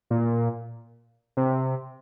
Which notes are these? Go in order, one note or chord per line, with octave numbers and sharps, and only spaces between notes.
A#2
C3